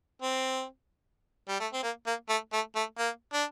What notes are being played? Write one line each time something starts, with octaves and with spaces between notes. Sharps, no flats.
C4
G3
A3
C4
A#3
A#3
A3
A3
A3
A#3
D4